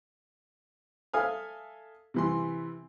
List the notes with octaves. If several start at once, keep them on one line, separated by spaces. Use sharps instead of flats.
A4 E5 F5 G#5 D#6 F6
C3 E3 C6